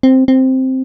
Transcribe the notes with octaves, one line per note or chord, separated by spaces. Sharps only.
C4
C4